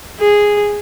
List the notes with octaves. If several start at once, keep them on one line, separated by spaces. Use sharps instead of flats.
G#4